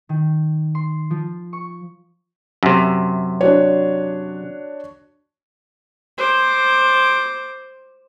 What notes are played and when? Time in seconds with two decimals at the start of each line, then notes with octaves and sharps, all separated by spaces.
0.09 D#3
0.75 C6
1.10 F3
1.53 C#6
2.63 F#2 C3
3.41 D4 F#4 C#5
6.18 C5 D6